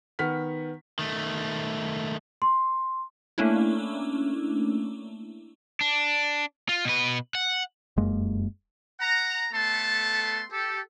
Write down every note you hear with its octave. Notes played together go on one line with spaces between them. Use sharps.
D#3 B3 F#5 F6 B6
D#3 A3
C6
A3 A#3 C#4 D4 E4
D4
F4
B2 B4
F#5
F1 F#2 G#3 A#3
F#5 A#5
A3 B3 A4 A5 C6
G4 A4